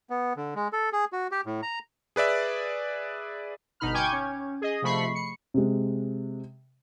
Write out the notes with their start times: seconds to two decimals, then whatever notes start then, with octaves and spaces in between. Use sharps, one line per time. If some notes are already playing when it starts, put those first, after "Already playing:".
0.10 B3
0.36 D3
0.55 G#3
0.73 A4
0.92 G#4
1.13 F#4
1.32 G4
1.46 A2
1.62 A#5
2.16 G#4 B4 D5 E5
3.80 G1 B2 D#4 B5 F6
3.94 G5 G#5 C#6 D6 G6 G#6
4.12 C#4
4.61 G#4 D#5
4.82 C3 F3 A3 B5 C#6 C7
5.15 C#7
5.54 C3 G#3